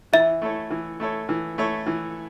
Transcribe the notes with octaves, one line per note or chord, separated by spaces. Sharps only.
E3 E5
A3 E4 A4 C#5
E3
A3 E4 A4 C#5
E3
A3 E4 A4 C#5
E3